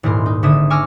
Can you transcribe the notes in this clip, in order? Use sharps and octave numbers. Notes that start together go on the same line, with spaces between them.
D#1 G#2 E4 A#4 C6
D#4
G#1 D3 E5 D#6 D#7
G#5 C#6 D6 E6 F6 A#6